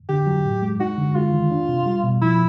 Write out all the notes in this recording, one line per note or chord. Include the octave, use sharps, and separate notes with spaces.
D3 G4
F#3
A2
G#3
D#4 F#4
D3
G#3 F4
D#3
D4
C3
G3
B2
F3 E4